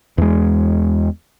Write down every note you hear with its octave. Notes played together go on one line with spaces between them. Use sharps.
E2 G#3